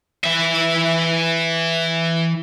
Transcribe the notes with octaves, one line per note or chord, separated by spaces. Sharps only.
E3 E5